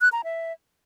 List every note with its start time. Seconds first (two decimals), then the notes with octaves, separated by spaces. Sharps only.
0.01 F#6
0.12 A#5
0.24 E5